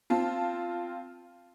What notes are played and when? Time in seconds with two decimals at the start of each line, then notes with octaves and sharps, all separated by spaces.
0.10 C4 F4 A5